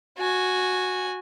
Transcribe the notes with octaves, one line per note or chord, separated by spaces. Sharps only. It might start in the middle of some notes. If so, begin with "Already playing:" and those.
F#4 G#5